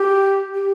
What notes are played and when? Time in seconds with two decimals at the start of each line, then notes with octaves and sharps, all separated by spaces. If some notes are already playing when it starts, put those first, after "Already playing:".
Already playing: G4
0.54 G4